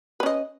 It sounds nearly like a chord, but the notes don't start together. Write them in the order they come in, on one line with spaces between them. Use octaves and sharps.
B4 C#4 D#5